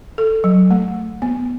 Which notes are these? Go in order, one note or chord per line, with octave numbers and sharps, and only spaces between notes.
A4
F#3
A3
B3